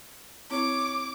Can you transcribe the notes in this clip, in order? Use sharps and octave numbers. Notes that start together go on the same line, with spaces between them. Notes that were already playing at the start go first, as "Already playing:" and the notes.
C4 E4 C#5 D6